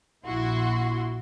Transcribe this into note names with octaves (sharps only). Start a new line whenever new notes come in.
A#1 E4 F#4 C6